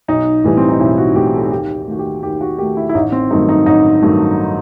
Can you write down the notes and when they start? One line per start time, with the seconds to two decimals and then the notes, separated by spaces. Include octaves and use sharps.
0.08 B1 D#4
0.44 A2 E3 G3
0.57 C4
0.68 D#4
0.80 B1 E4
0.98 F#4
1.16 A2 E3 G3 G4
1.34 A4
1.51 D#2 G4
1.87 D#3 A3 F#4
1.99 G4
2.23 D#2 G4
2.41 F#4
2.59 D#3 A3 G4
2.77 E4
2.89 E4
2.94 A1 D#4
3.12 C4
3.31 G2 D#3 F#3 A3 D#4
3.49 D#4
3.66 A1 D#4
4.02 G2 D#3 F#3 A3